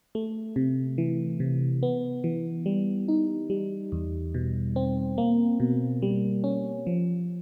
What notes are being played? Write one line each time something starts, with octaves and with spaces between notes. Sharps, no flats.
A3
C3
E3
C3
B3
E3
G3
D#4
G3
E2
B2
C4
A#3
B2
G3
C#4
F3